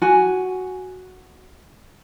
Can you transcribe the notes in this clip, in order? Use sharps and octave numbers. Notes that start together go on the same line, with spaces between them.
F#4 G#5